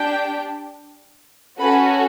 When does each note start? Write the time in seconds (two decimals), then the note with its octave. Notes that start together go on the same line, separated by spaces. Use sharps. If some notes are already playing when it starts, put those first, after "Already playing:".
Already playing: D4 G4 G5
1.59 C#4 F#4 A4 B4 B5